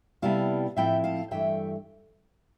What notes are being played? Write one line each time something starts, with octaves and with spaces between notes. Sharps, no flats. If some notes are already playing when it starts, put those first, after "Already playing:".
C3 G3 B3 E4 F5 A5
A2 F3 C4 E4 E5 G5
F5 A5
G2 E3 A3 E5 G5